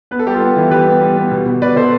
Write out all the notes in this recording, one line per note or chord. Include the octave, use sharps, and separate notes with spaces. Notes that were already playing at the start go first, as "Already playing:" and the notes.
B3 B4
A4
G3 G4
F4 A4
B3
E3
G3 G4 B4
B3
G3
B3
B2
B2
B2 B4 D5
B2 A4 C5